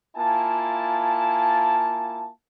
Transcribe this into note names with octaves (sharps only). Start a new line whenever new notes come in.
A#3 E4 F4 G#5 A5